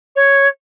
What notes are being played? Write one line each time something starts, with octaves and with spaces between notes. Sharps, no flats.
C#5